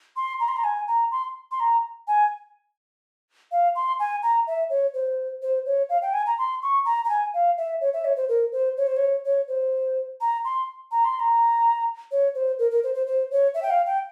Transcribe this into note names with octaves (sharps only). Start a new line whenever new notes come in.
C6
A#5
C6
A#5
G#5
A#5
C6
C6
A#5
G#5
F5
C6
G#5
A#5
E5
C#5
C5
C5
C#5
F5
G5
G#5
A#5
C6
C#6
A#5
A#5
G#5
F5
E5
C#5
E5
C#5
C5
A#4
C5
C#5
C5
C#5
C#5
C5
A#5
C6
A#5
C6
A#5
C#5
C5
A#4
A#4
C5
C5
C5
C#5
E5
G5
F5
G5